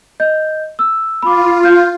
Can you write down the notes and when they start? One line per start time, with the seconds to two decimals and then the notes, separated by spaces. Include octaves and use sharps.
0.20 D#5 G6
0.79 E6
1.22 F4 B5 D6
1.63 F6 G6